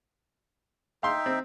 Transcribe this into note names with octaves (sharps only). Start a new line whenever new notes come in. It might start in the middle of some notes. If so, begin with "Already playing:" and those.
D#4 E5 F5 G5 C6
C4